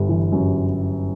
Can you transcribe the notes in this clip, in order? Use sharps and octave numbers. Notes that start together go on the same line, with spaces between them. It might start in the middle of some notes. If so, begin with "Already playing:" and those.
Already playing: G1 G3
E3
F#2